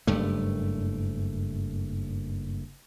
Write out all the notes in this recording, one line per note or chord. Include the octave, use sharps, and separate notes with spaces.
F#1 G2 A3